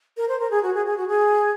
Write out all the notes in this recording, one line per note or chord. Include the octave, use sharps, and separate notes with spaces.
A#4
C5
A#4
G#4
F#4
G#4
G#4
F#4
G#4